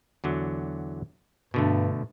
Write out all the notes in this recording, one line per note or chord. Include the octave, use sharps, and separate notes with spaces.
E2 D3 F#3
G2 B2 D3 A3